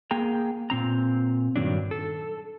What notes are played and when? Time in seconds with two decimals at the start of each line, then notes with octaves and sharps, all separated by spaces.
0.11 A#3 G#4 G5 A#5
0.70 A#2 C4 A#5
1.56 G2 D#3 F#3 D4
1.91 A4